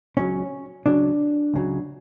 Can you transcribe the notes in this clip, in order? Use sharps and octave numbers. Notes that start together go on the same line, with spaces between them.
C#2 C#3 F#3 C#4
C#2 C#3 F#3 D4
C#2 C#3 F#3